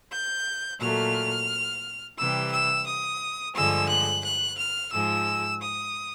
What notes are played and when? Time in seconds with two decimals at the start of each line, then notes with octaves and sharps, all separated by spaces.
0.11 G6
0.80 A#2 F#3 A3 F6
2.17 C3 E3 G3 E6
2.51 E6
2.86 D#6
3.54 G2 D3 F3 G#3 E6
3.88 F#6
4.24 F#6
4.57 F6
4.92 G#2 F3 G#3 E6
5.61 D#6